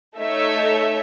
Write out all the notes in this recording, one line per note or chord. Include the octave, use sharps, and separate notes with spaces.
A3 D#4 A4 C#5 E5